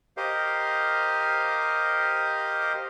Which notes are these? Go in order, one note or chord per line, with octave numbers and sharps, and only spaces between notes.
G4 A#4 C5 D#5 F5